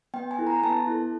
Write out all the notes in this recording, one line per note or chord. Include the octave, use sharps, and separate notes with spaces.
B3 G5
G#5
E4 A4
A#5
B3 A5
E4 A4